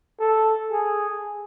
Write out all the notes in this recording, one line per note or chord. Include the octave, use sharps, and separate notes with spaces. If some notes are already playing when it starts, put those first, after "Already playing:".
A4
G#4